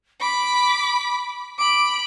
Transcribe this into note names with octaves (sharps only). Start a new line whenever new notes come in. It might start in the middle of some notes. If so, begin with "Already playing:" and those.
B5 D6 B6
B5 D6 D7